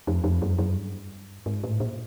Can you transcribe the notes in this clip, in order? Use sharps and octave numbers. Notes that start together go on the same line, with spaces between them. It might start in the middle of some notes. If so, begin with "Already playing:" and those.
F2
F2
F#2
F#2
G2
G#2
A2
A#2